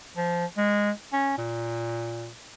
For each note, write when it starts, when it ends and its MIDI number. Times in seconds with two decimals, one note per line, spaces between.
0.17 0.45 53
0.57 0.91 56
1.13 1.34 61
1.38 2.29 46